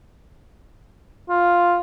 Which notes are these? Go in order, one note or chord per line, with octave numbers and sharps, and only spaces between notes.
F4